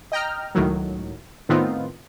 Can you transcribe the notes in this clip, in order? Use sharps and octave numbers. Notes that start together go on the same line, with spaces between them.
D#5 G5 A#5 F6
C#2 A2 D#3 F#3
A2 D#3 B3 C4 D#4 F4